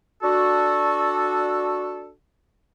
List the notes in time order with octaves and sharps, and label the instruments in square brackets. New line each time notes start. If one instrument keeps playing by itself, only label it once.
[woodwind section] D4 F#4 A4